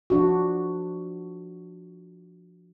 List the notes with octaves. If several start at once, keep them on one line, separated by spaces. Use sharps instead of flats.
F3 D4 F#4